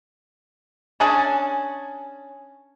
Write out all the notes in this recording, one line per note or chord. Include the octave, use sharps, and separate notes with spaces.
C#4 D4 G#4 A5